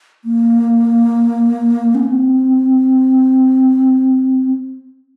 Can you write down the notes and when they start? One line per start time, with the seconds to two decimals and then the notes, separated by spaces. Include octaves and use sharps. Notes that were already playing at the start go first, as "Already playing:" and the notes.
0.24 A#3
1.95 C#4
2.05 C4